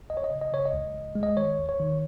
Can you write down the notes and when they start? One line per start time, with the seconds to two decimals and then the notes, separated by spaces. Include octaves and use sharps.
0.10 C#2 D#5
0.17 C#5
0.24 D#5
0.31 C#3
0.41 D#5
0.52 C#3 C#5
0.66 D#5
0.73 C#2
0.94 C#2
1.15 G#3
1.23 D#5
1.37 D#3 C#5
1.58 D#2
1.69 C#5
1.79 D#3